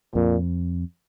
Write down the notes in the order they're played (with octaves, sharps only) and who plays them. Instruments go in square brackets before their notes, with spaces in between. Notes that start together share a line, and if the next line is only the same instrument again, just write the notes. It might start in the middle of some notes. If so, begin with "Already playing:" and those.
[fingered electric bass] F2 [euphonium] A#2